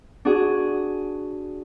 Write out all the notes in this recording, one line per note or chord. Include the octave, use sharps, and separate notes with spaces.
D4 F#4 G#4